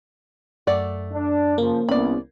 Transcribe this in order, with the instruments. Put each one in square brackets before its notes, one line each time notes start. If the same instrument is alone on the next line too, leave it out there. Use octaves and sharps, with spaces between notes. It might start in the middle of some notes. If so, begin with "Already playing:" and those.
[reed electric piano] F#2 [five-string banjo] A3 D5 F#5
[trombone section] D4
[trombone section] C#3 F3 [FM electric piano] A#3
[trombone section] C2 [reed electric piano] B3 C#4 [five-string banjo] D5 B5